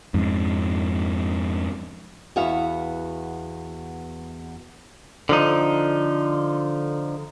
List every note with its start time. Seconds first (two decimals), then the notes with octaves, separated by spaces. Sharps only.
0.14 F2 G#2
2.36 E2 B3 F#4 E5 F5
5.29 D3 F3 D#4